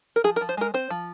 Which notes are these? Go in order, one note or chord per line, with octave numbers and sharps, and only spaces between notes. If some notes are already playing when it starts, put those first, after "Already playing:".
A#4
F3 G#4
A#4
F3
C5
G#3 A#4
C4 C5
F3